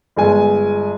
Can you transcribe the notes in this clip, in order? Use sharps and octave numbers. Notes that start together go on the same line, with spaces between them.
G1 G#3 G#5